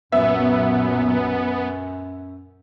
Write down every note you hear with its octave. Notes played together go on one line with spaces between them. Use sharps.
B1 F#2 A#2 F#3 B3 E5